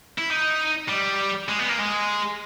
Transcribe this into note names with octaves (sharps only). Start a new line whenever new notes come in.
E4
D#4
G3
G#3
B3
A#3
G#3